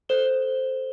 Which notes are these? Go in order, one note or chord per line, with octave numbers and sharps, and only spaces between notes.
A4 C5 E7 G7